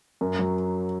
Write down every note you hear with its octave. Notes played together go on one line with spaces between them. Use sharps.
F#2
F#3